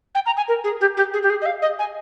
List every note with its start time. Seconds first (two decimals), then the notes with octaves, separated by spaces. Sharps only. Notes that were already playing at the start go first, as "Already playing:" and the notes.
0.14 G5
0.26 A#5
0.37 G#5
0.48 A#4
0.64 G#4
0.80 G4
0.97 G4
1.13 G#4
1.23 G4
1.30 G#4
1.41 D#5
1.45 F5
1.62 D#5
1.79 G#5